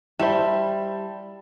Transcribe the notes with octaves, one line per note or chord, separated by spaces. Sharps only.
G3 E4 F#4 C5 E5 A5 E7